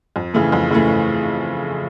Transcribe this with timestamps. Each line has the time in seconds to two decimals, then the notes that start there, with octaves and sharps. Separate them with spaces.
0.16 F2
0.34 C#3 E3 A3
0.52 F2
0.70 C#3 E3 A3